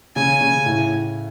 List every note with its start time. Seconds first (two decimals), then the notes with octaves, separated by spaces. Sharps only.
0.16 C#3 G#5
0.41 C#3
0.66 A2